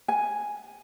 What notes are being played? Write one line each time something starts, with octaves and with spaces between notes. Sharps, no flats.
G#5